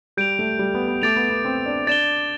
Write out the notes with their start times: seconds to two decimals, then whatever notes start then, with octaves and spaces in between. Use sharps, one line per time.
0.17 G3 G6 D7 F7
0.39 A3
0.59 G3
0.75 B3
0.88 B3
1.02 A3 D6 A6 D7 F7
1.16 B3
1.30 B3
1.45 C4
1.66 D4
1.87 D4 A6 E7 G7